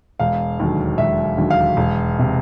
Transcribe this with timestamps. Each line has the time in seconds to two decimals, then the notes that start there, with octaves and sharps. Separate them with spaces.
0.20 E1 F5
0.60 D#2 D3 F#3
0.98 E1 E5
1.38 D#2 D3 F#3
1.50 F5
1.77 E1
2.19 C3